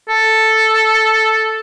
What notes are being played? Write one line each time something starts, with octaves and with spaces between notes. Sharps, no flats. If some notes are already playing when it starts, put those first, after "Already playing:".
A4